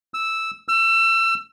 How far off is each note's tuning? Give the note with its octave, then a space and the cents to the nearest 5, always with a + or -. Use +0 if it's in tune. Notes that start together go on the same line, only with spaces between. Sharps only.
E6 -5
E6 +30